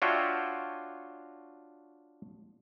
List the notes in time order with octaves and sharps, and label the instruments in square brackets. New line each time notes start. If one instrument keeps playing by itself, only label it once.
[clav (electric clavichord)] D4 F4 F#4 C#5 E5 G5